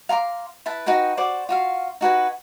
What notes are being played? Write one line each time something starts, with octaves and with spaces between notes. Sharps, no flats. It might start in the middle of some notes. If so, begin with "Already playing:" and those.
F5 A#5 C6 D6
E4 B4 A5
D#4 F#4 B4 G5
F#4 C5 D5 D6
F4 F#4 F5
D#4 F#4 B4 G#5